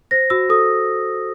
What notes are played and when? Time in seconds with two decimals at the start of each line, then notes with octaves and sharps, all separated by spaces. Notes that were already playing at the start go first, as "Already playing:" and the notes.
0.11 C5 A#6
0.30 F#4 E6
0.49 A4 D#6